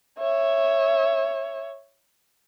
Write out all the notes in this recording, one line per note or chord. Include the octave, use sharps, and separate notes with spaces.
C#5 E5